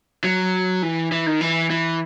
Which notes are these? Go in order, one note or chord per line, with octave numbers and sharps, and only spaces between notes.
F#3
E3
E3
D#3
E3
E3